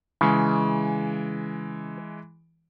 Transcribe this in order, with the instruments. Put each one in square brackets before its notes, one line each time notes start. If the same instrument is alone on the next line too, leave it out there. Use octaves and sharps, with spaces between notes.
[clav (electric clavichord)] C#3 [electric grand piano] E3 G#3